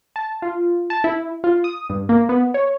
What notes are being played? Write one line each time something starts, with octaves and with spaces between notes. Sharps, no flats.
A5
F4
A5
E4
F4
D#6
G2
A#3
B3
C#5